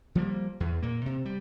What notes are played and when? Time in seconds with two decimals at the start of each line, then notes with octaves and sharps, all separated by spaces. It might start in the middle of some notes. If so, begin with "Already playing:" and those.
0.15 F3 G3 A#3
0.60 E2
0.82 A#2 A#3
1.06 C3
1.25 G3